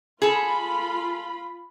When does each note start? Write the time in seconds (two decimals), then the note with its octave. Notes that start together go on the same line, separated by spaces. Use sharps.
0.22 F4 G#4 A4 B5